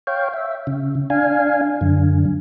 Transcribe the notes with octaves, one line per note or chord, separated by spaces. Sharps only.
C#5 F5 G5
E5
C#3
D4 F5 G#5
F#2 D3